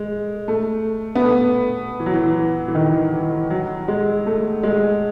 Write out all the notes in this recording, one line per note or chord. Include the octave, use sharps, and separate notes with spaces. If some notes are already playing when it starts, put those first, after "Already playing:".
Already playing: G#3
A3
B3
A3
E3
F#3
E3
E3
D#3
E3
F#3
G#3
A3
G#3